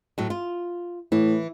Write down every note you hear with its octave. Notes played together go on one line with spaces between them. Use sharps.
A2 F#3
F4
A2 E3